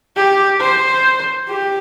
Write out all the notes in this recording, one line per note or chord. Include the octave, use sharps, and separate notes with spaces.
G4
C5
G4